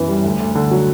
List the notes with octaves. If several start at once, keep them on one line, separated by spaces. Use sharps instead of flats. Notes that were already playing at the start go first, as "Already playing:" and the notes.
Already playing: F#2 E3 B3
G3
D2
D2
D3
F#3